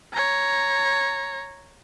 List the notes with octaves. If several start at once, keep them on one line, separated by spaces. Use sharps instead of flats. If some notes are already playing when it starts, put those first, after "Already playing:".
C#5 A#5